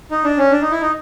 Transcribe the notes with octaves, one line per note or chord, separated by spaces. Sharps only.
D#4
D4
C#4
D4
D#4
E4
D#4